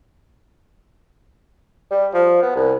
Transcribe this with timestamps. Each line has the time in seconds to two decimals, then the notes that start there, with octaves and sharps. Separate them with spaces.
1.91 G3
2.14 F3
2.43 B3
2.56 C2